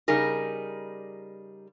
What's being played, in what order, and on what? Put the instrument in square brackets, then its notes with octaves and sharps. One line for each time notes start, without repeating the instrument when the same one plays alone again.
[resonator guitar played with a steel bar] C#3 G3 D#4 G#4 A#4